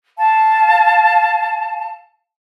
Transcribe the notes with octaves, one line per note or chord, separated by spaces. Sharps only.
F5 A5